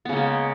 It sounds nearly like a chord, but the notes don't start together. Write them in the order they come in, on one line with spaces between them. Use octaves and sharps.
B3 C#3 A#3 G#3